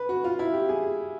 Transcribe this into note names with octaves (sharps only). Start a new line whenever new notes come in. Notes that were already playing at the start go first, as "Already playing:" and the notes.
Already playing: B4
F#4
F4
E4
G4
G#4